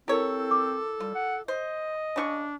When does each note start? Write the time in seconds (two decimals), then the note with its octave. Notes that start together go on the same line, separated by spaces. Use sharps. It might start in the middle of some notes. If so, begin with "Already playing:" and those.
0.08 C4 E4 G4 A4 A#4 C#5
0.51 D6
1.00 G3 F4
1.15 F#5
1.48 C5 D#5
2.16 C#3 D4 F#4 C#6